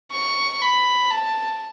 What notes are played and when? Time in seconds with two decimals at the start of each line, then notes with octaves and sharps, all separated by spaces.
0.12 C#6
0.61 B5
1.11 A5